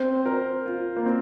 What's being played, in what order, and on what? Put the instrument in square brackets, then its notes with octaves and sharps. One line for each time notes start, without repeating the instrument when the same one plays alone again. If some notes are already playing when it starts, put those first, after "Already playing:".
Already playing: [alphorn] C4 [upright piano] C5
[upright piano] A#4
F4
A#3
C4